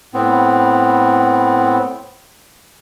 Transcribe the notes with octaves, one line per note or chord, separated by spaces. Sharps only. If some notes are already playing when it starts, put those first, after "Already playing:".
A2 B3 C4